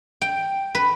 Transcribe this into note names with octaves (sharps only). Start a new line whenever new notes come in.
G5
B4